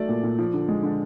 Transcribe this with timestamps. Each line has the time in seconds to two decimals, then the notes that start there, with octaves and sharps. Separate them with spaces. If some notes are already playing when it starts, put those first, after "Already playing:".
Already playing: F#3 A3 D5
0.09 A#2
0.24 A#2
0.39 F3
0.53 D3
0.68 G#3
0.83 D3